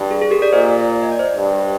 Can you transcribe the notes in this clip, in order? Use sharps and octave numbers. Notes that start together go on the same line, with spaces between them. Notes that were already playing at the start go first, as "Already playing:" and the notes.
Already playing: G2
G#4
G#4
G4 A#4
A#4 D5
A#2 C5 D#5
D#5
D5
C5 D#5
G2